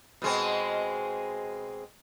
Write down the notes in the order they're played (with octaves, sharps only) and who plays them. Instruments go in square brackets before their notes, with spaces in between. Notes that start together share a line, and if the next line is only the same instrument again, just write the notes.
[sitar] B2 G#3 C4